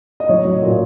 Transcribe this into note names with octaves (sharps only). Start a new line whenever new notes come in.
D#5
F#3 C#5
F#3
A#2